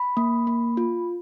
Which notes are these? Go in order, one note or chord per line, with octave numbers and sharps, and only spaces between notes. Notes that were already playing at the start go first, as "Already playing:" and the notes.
Already playing: B5
A#3
A#3
F4